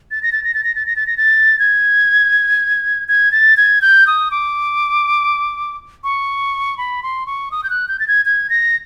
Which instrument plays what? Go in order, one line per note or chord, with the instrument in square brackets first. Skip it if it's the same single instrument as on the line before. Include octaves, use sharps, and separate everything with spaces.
[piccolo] A6
A#6
A6
A#6
A6
A#6
A6
A#6
A6
A#6
A6
G#6
G#6
A6
G#6
G6
D#6
D6
C#6
B5
C6
C#6
D#6
G6
F#6
G6
A6
G#6
G#6
A#6